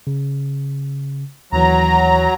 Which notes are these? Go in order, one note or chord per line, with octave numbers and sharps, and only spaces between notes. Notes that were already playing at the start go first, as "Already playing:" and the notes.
C#3
D#2 E3 F#3 A#5